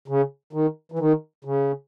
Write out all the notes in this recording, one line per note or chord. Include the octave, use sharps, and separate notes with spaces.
C#3
D#3
E3
D#3
C#3